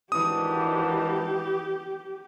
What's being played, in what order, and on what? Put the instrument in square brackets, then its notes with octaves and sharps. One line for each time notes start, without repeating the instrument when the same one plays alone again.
[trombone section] G#1 G#2 D4 [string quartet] E3 [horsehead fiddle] G4 [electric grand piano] D#6